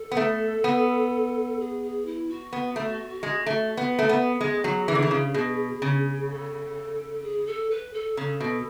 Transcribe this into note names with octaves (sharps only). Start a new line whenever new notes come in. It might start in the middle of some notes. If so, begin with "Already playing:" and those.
Already playing: A4
B3
A3
B3
G#4
G#4
E4
F#4
B3
A3
G#3
A3
B3
A3
B3
G#3 G#4
F#3
E3
D3
E3
C#3
B2
C#3
A4
G#4
A4
B4
A4
C#3 A4
B2